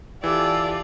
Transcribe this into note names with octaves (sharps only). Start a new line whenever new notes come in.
E3 F4 G4 A4 D5 E6